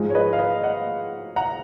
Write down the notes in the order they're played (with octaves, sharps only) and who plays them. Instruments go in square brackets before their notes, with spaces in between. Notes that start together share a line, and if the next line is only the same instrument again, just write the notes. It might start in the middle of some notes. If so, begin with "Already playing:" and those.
Already playing: [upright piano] G#2 F3 G#3
C#5
B4 D#5
F5
B4 D#5
D#5 F#5
F#5 A#5